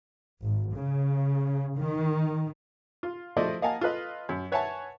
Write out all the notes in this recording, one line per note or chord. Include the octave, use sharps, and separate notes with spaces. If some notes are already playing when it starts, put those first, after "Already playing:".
G#1
C#3
D#3
F4
F3 A3 E4 C5 D5 D#5
A#3 D#5 F5 F#5 G#5 A5
F4 A4 B4 D#5
F#2
B4 C#5 E5 F#5 G#5 A5